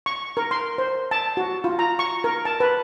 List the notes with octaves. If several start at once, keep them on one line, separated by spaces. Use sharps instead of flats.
C#6
A#4
C6
C5
A5
F#4
F4
A#5
C#6
A#4
A5
B4